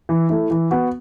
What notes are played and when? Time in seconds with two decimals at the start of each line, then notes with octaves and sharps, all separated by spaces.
0.09 E3
0.29 A3 E4
0.51 E3
0.71 B3 F#4